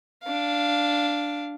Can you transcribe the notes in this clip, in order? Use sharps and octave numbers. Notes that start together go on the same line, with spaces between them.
D4 F5